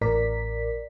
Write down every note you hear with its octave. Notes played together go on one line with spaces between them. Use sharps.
A1 A2 A#4 D5 B6